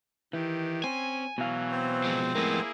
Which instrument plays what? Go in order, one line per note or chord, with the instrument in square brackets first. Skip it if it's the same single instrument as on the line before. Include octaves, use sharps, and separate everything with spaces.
[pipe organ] D#3 G4 [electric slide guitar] E3
[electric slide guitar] C4 [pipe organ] C#4 [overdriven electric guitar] G#5
[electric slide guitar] B2 F5 [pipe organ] E3 F#3
[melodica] C4 C5
[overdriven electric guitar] F3 G#3
[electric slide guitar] F2 A2 A#4 [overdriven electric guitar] G#3 B3 [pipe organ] A#3 E4 G#4